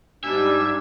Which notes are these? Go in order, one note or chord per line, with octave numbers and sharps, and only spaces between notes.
G#2 G3 D4 E5 G#5